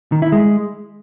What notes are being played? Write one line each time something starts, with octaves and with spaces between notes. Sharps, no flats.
D#3
E4
G#3